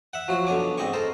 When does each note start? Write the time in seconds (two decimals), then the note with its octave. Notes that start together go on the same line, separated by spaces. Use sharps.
0.13 E5 F#5
0.28 F3 F#3 F#4
0.47 B1 D3 C#5 G#5 D6
0.78 G#2 C4 D#5 G#5 C#6
0.93 A4 A#4 C5